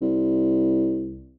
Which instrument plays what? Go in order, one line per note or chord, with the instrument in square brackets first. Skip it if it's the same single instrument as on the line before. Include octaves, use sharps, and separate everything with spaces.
[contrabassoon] C2